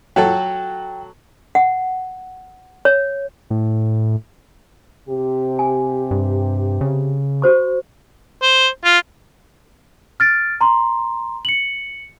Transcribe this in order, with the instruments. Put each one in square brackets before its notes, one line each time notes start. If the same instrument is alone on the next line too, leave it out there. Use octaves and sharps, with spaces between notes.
[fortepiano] F#3 F#4 A4 [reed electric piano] G5
[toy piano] F#5
C#5
[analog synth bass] A2
[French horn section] C3 G4
[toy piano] G#5
[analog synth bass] G2
C#3
[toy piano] F#4 C5 C#6
[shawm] C5
F4
[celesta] F6 A6 D7
A#5 C6
C#7 F#7